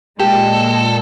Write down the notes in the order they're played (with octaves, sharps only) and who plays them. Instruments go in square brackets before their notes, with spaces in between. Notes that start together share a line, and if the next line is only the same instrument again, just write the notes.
[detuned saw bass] A#2 [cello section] G#3 [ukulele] G4 [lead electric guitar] A4